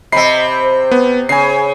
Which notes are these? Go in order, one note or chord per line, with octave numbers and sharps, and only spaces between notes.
C3 C4 D#5 B5 C7
C5
B3
C#3 C5 G#5 C7